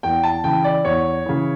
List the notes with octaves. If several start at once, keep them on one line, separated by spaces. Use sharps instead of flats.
E2 G5
A5
C#3 E3 G5
D5
E2 C#5
C#3 E3